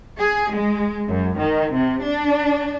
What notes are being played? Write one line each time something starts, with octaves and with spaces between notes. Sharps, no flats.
G#4
G#3
F#2
D#3
C3
D4